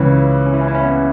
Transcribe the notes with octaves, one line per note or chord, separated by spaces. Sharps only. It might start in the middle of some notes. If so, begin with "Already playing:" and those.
Already playing: C#2 C#3 E3
C#4
E4
C#4
E4
C#4
B3